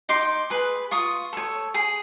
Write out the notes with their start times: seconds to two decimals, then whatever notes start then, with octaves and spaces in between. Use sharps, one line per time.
0.09 D#4 C6 D6
0.50 G#4 B4
0.91 F4 C#6 D#6
1.33 A4 C#5
1.74 G#4